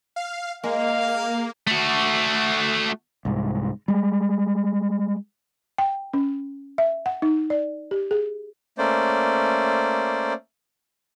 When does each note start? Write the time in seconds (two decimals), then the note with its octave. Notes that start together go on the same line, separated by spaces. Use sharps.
0.16 F5
0.64 G#3 A#3 F5
1.67 A3 F#4
3.25 C2 G#2
3.88 G3 G#3
5.78 G5
6.14 C#4
6.78 E5
7.06 F#5
7.22 D#4
7.50 D5
7.91 G4
8.11 G#4
8.78 A3 A#3 C#4 C5 D5